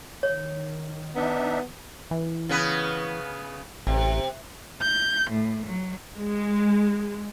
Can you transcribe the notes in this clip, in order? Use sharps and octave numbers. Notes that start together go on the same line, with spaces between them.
D#3 C#5
B3 D4 D#4 E5
E3
C#3 B3 B4
A1 C3
G6
A2
F#3
G#3